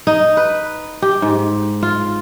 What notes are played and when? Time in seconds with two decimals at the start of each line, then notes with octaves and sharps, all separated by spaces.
0.07 D#4
0.37 B4
1.02 G4
1.22 G#2
1.83 F4